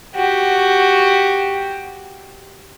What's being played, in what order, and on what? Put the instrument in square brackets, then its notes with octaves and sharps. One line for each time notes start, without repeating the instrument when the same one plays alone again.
[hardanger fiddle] F#4 G4